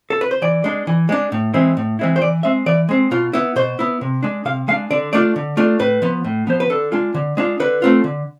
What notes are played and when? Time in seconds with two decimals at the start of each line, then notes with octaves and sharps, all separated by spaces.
0.10 A4
0.21 B4
0.31 C5
0.42 E3 D5
0.64 G#3 D4
0.87 E3
1.09 G#3 D4
1.32 A2
1.54 E3 G#3 C4 E4
1.77 A2
1.99 E3 G#3 C4 E4
2.16 C5
2.22 E3 D5
2.43 G#3 C4 E5
2.66 E3 D5
2.89 G#3 C4
3.11 B2 F4
3.33 B3 E4
3.56 B2 C5
3.79 B3 E4
4.01 C3
4.23 G#3 D4
4.45 C3 F5
4.68 G#3 F5
4.72 D4
4.91 D3 D5
5.13 A3 D4 F4 D5
5.36 D3
5.57 A3 D4 F4
5.79 A2 B4
6.02 F3 B3
6.24 A2
6.47 F3 B3 C5
6.60 B4
6.70 D3 A4
6.92 G#3 D4 F4
7.14 D3
7.37 G#3 D4 F4
7.60 D3 B4
7.82 A3 C4 F4
8.04 D3